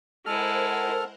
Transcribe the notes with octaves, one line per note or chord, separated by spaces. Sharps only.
G#3 E4 A4 A#4 C5 F#5 F6